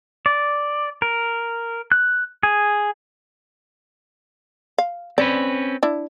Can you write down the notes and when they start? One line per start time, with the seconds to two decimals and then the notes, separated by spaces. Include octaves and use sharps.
0.26 D5
1.02 A#4
1.92 F#6
2.43 G#4
4.78 F5
5.18 C4 C#4 B4 D5
5.83 D4 E4